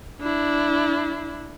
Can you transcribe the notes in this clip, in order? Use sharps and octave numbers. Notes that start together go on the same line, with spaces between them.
D4 E4